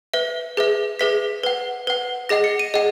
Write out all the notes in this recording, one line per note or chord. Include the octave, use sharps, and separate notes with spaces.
B4 E5
G#4 B4 E5
G#4 B4 E5 B6
B4 F#5
B4 F#5
G#4 D#5 F#5 A#6
C#7
D#7
G#4 D#5 F#5